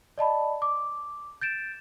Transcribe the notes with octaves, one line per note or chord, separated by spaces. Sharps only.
D5 D#5 A5 B5
D6
G6 A6 D7 E7